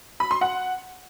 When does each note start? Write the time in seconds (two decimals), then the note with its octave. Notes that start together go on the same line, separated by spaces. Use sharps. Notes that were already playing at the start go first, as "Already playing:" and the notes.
0.20 B5
0.31 C6
0.41 F#5